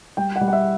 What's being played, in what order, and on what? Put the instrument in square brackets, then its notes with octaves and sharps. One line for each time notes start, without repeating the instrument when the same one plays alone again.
[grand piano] G3 G5
F#5
G3
F#5
E5